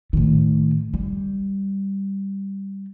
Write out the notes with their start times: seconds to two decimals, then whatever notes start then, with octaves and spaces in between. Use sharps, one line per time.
0.13 A2 D#3
0.94 G3